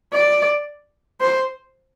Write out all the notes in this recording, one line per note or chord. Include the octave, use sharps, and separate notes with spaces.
D5
C5